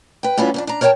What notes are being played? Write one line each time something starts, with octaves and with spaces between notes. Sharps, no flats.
B4 G5
A2 G3 B3 C#4 F4 F#4
F2 C#4 D4
D4 A#5
A#4 C#5 D5 F#5 G5 A5